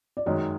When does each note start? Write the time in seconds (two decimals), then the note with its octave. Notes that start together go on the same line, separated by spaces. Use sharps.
0.17 D5
0.26 F#2 D#3 G#3 C#5 D#5